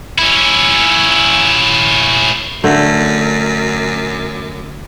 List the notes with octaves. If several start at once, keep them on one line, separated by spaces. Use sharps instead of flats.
C#4 E4
F#2 D3 A3